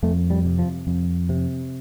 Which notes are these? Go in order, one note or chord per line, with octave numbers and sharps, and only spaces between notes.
F2 A3
G3
C3
F3
F2
C3